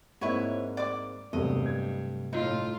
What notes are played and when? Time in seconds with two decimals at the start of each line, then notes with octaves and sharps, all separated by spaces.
0.21 G#2 A#3 C4 E4 B4 C#5
0.77 D5 D6
1.33 E1 G2 C3 F#3 A3 D#5
1.66 G#6
2.33 A2 D#4 F4